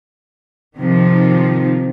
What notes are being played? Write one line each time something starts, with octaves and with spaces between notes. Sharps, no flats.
C3 D#3 F3